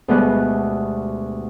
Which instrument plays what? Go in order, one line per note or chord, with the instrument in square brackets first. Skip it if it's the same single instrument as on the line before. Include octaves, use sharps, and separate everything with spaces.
[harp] D2 B2 D3 G3 G#3 F#6